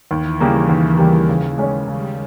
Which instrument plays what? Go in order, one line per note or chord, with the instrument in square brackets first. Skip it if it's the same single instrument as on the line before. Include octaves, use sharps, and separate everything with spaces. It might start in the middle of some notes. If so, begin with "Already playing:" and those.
[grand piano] D#2 [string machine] E3
[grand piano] C#3 G3 A#3
D#2
C#3 G3 A#3
C#3
G#3 C#4 G#4 C#5
[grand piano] C#3 [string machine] G3